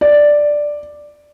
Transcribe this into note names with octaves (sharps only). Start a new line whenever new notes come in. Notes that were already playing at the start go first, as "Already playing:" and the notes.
D5